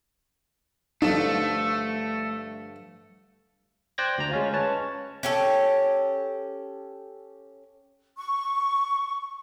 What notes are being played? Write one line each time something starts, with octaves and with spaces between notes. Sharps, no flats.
G2 D3 F3 A3 D#4
C5 D5 G5 F#6 G#6 A#6
D2 A#5
G#3 C#4 F4
C#4 B4 C#5 A5
C#4 G4 A4
C#6